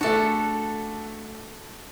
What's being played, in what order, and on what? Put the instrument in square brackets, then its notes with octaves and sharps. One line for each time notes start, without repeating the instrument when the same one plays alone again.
[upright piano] A3 D4 [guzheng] F#4 A4